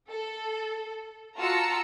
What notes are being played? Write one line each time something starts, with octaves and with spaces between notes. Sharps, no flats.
A4
F4 F#4 A5 A#5 E6 C#7